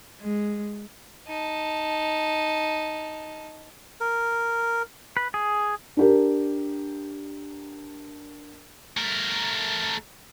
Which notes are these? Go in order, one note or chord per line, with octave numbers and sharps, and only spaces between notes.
G#3
D#4 A5
A#4
B4
G#4
D4 G4 A#4
A3 A#4